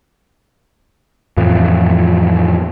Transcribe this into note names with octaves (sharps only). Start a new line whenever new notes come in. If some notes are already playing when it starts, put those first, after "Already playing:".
F2 A2 E3 F3